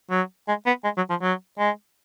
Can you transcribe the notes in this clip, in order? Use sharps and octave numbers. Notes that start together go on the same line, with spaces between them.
F#3
G#3
B3
G#3
F#3
F3
F#3
G#3